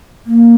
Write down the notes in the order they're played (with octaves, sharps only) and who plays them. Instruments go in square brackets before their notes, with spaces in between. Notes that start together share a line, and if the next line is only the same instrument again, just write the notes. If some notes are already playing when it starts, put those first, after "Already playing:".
[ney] A#3